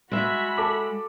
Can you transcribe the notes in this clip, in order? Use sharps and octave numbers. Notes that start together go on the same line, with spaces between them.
G#3 F#4 E5 B5
A4 D6